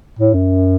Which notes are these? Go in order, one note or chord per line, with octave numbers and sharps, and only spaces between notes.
A2
F#2